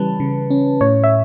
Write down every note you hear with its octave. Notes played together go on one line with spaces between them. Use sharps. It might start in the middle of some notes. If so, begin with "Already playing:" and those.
Already playing: C#3 E3 G3 C#4 B4 A5
C#3
C#4
A2 C#5
E5